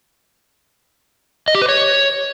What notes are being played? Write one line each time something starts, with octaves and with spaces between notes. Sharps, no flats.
D#5
G4
B4
C#5